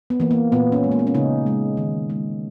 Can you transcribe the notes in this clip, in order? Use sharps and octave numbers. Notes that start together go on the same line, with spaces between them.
B3
E3 A#3
A#3
A#2 B3
C#4
G#3
A#3
B3
C#4
C#3 D#4
G#3
D#3
G#3